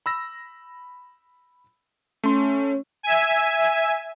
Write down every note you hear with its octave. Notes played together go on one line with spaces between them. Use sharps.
B5 E6 A#6
A3 C#4 C6
E5 G#5